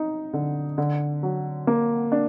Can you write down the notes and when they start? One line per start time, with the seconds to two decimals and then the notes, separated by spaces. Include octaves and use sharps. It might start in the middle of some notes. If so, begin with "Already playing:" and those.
Already playing: D#4
0.33 D3
0.78 D3
1.23 F#3
1.67 A#3
2.12 D4